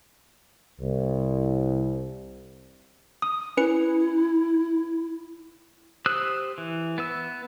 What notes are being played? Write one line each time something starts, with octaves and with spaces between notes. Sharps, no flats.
C2
D#6
C#4 E4 B4 C#7
G4 C5 D#6 E6 F#6
E3
B3 B4 E6